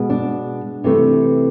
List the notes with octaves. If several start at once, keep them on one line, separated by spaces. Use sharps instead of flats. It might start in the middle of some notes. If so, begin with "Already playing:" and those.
Already playing: B2 G#3
D4
C3 E3 A3